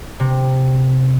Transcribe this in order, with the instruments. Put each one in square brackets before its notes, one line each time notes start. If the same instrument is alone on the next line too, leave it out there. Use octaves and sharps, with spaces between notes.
[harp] C3